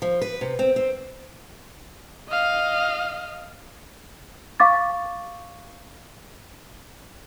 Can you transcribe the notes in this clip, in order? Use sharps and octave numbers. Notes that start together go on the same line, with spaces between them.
F3
B4
C3
C4
C4
D#5 F5
F5 C#6 D6 A6